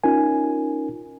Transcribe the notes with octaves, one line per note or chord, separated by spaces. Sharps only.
C#4 D#4 F4 A#4 G#5